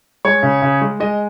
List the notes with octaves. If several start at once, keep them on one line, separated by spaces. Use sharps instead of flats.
G#3 C#5
C#3
C#3
G#3
G#3 D#5